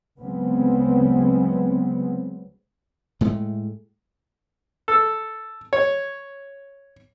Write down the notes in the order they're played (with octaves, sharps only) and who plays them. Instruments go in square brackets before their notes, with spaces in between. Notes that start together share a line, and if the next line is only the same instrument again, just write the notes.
[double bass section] D2 C#3 F#3 G#3 B3 C4
[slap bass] A2 G#3 A3
[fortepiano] A4
C#5